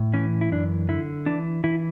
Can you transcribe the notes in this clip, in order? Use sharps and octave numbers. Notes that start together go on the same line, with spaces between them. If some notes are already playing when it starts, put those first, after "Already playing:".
Already playing: A2
E3 C#4
E4
F#2 D4
D3 E4
E3 D4
E3 E4